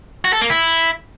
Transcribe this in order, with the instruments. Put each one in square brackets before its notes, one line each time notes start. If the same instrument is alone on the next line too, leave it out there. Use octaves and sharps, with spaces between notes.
[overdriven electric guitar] F#4
A4
A#3
E4